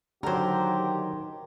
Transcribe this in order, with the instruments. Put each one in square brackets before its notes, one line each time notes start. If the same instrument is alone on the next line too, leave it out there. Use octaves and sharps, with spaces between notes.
[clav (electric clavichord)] D3 F#3 [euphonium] D#3 [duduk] G4 [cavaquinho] A#4 C5